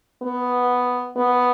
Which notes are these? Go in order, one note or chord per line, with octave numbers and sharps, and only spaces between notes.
B3
B3